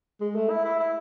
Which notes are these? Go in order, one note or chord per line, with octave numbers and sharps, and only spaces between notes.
G#3
A3
E4
E4
E4